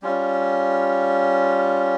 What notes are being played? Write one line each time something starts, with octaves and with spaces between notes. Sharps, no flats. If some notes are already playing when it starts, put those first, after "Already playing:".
G3 C#4 F4